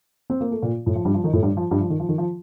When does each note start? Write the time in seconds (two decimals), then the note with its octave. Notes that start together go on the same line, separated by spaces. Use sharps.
0.30 C4
0.41 A#3
0.51 A3
0.62 A#2 A#3
0.86 A2 A3
0.95 F3
1.05 G2 G3
1.14 F3
1.24 D#3 D#4
1.33 A2 A3
1.43 G2 G3
1.57 F3
1.71 G2 G3
1.80 F3
1.90 D#3
2.00 F3
2.09 D#3
2.18 F3